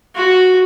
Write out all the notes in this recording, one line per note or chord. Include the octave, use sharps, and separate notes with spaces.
F#4